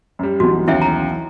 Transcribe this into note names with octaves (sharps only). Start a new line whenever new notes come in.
F#2 G3
B1 E3 B3 F#4
D#2 C#3 E4 E5
A#5